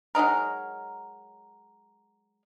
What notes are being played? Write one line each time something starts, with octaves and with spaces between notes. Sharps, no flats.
F#3 G#3 D#4 A#4